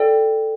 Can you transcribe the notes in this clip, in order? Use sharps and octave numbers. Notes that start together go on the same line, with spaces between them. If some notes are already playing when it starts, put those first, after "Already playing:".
Already playing: A4 D5 G5